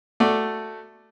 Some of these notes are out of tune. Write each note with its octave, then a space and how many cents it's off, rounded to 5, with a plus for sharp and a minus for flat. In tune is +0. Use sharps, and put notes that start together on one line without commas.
A3 +0 F#4 +0 D5 +5